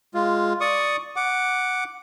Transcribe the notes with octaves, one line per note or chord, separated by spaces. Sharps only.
G#3 F4
D5 C#6 D#6
F#5 D6